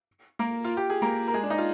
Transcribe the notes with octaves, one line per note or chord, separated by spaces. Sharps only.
A#3 A#4
F4
G4
G#4
A#3 A#4
A#4
G#3 G#4
D4
D#4
F4